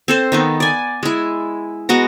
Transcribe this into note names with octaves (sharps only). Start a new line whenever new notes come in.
C4 A4 C5
D#3 B3 D#4
D5 G#5
G#3 E4
G#3 B3 F#4 A#5